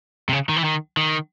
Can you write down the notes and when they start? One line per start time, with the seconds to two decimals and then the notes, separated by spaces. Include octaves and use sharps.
0.29 C3
0.33 C#3
0.49 D#3
0.56 E3
0.64 D#3
0.97 D#3